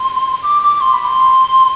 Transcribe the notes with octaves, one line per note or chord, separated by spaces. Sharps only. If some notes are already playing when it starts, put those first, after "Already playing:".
Already playing: C6
D6
D6
C6
B5
C6